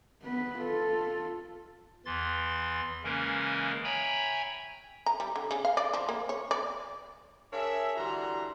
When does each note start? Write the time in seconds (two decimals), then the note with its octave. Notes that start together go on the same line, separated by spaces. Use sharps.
0.23 B3 B4
0.59 F4 A4
2.05 E2 E3 C6 A6
3.04 C#3 E3 G#3 A#3 C#4 A#4
3.84 C#5 E5 G5 G#5 A#5 B5
5.06 A#5
5.20 G3
5.36 D3
5.51 C#3
5.65 F5
5.77 D5
5.94 F3
6.09 A#3
6.29 C#5
6.51 D5
7.52 D4 G#4 A#4 C#5 E5
7.97 D3 E3 G3 F#4 A#5 C6